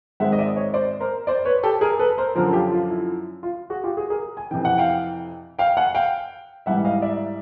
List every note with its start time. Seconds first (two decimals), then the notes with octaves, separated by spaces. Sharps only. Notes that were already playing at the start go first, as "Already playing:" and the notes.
0.20 G#2 D#3 G#3 C4 E5 F#5
0.32 D#5
0.38 D5 E5
0.56 C#5 D#5
0.74 C5 D5
1.00 A#4 C5
1.27 C5 D5
1.45 B4 C#5
1.63 G4 A4
1.81 G#4 A#4
1.99 A4 B4
2.18 A#4 C5
2.35 F#2 D3 F3 A#4 C5
2.53 F4 G4
2.72 F4
2.89 E4
3.43 F4
3.70 F#4 G#4
3.84 F4 G4
3.97 F#4 G#4
4.10 G#4 A#4
4.37 G#5
4.51 F2 C3 E3 G5
4.65 F#5
4.78 F5 G5
5.59 F5 G5
5.77 F#5 G#5
5.94 F5 G5
6.66 G#2 E3 G3 E5 F#5
6.79 E5
6.85 D#5 F5
7.02 D5 E5